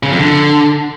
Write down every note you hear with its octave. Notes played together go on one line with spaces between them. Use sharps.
C#3
F2
D3